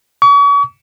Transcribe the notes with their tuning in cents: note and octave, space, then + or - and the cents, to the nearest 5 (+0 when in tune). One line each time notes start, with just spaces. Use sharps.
C#6 +40